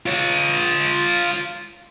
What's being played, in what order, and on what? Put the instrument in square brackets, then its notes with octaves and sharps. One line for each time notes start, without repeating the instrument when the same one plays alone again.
[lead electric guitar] F4 C#5